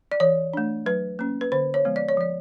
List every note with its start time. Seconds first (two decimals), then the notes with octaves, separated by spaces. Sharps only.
0.12 D5
0.20 E3 C#5
0.53 A3 D4
0.86 F#3 B4
1.19 A#3 C#4
1.41 B4
1.52 D3 C5
1.74 C#5
1.85 F3 G#3 B3
1.96 D5
2.09 C#5
2.17 F3 D5